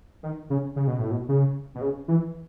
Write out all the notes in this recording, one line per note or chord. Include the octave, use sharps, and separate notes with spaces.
D#3
C#3
C#3
B2
A2
B2
C#3
B2
C#3
E3